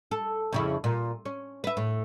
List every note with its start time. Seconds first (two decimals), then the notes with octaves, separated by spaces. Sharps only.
0.11 A4
0.53 F2 C#3 E4
0.84 A#2
1.25 C#4
1.64 B4 E5
1.77 A2